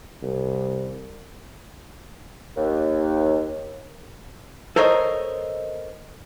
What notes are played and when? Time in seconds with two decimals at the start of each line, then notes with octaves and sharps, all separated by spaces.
0.23 C2
2.56 D#2
4.76 A4 A#4 C5 C#5 D#5